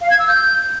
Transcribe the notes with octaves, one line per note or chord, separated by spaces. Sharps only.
F5
G#6
E6
G6